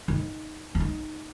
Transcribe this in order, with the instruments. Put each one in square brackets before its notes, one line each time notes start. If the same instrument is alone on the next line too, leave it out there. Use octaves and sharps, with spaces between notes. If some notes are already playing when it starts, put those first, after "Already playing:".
[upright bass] D#4
C#4
D#4